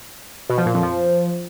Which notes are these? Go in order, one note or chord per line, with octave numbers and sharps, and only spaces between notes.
B2
F3
A#2
F2
F3